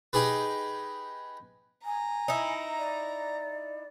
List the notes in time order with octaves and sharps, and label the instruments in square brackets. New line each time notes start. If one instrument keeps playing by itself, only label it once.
[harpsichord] D#4 G4 G#4 B4
[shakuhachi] G#5 [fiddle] A#5
[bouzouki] D#4 E4
[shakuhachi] D5